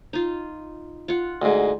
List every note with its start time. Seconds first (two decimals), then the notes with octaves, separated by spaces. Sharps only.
0.13 D#4 F4
1.08 F4 F#5
1.42 D2 G#2